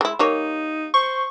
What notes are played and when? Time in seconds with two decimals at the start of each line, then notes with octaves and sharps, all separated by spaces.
0.01 G#3 E4
0.19 G3 A#3 D#4 C#5
0.94 C5 C#6